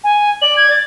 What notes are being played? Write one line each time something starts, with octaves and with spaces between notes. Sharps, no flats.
G#5
D5 F#7
G#6
A6